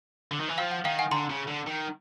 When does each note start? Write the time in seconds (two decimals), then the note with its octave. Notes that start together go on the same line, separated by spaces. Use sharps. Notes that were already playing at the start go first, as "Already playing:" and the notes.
0.31 D3
0.40 D#3
0.48 E3
0.58 F3 F5 G5
0.71 F#5
0.84 D#3 F5 G5
0.99 F#5 G#5
1.11 D3 A#5 C6
1.30 C#3
1.48 D3
1.67 D#3